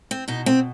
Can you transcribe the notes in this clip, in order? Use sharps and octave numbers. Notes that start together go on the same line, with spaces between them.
C4
B2 D#4
C4